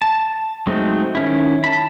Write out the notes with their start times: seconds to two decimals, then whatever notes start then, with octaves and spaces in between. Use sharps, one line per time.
0.02 A5
0.67 F#3 G#3 A3 C4 D#4
1.15 D#3 C#4 E4
1.64 A5 B5